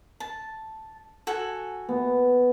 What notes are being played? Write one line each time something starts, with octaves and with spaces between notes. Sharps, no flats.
A5
F#4 A4 G#5
B3